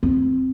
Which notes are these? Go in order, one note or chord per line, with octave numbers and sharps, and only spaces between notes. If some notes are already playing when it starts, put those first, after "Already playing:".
C4